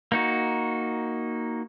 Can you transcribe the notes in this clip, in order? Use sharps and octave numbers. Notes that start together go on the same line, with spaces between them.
A#3 D#4 F#4